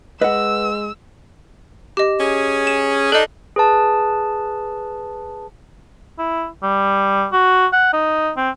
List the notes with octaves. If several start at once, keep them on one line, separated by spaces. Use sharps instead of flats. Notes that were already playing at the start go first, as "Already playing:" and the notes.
G#3 B4 D#5 F#5 E6
G4 D#5
C#4 G#4
E7
D4 D#4 A4 D#5
G#4 B4 A5
E4
G3
F#4
F#5
D#4
C4